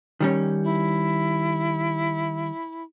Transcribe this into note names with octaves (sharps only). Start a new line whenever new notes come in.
D#3 G3 C#4
E4